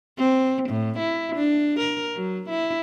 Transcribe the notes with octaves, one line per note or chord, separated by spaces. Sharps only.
C4
A2
E4
D4
A#4
F#3
E4